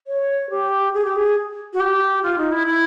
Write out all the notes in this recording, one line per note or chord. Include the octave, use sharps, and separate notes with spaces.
C#5
G4
G#4
G4
G#4
F#4
G4
F4
D#4
E4
E4